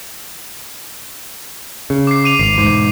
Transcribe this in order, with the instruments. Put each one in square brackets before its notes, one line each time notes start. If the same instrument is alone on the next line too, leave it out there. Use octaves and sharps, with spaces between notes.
[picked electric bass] C#3
[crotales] D6 C7
D6 D#7 F7
[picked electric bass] G#1 [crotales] C7 F7
[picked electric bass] E1 G#2